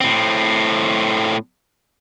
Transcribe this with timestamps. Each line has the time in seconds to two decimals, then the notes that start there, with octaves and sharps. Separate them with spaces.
0.01 A2 C4